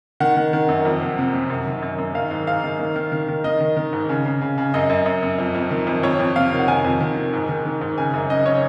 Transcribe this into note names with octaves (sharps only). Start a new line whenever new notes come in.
D#3 F#5
D#3
D#3
F#2
F2
C3
C3
C3
F#2
D#3
F#2
F#2
D#3 F5
G#2
G#2 F5
D#3
D#3
D#3
D#3
D#3
D#3 D#5
D#3
D#3
G#2
C#3
C#3
C#3
C#3
F#2 D#5
F#2
F#2
F#2
F2
F2
D#3
F2
F2 C#5
F2
C3 F5
D#3
F#5
D#3 G#5
F2
D#3
D#3
G#2
D#3
D#3
G#2
C#3 G#5
F#2
C#3 D#5
C#3 C#5